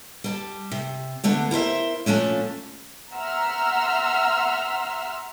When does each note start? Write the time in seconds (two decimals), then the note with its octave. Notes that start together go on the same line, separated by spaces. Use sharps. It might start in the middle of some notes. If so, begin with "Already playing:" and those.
0.24 G3 A5
0.71 C3
1.24 D3 A3 B3 D4
1.51 E4 A#4 C5 E5
2.06 A#2 F3 A3 C#4 D4
3.13 E5 F#5 A#5 C6 E6 F6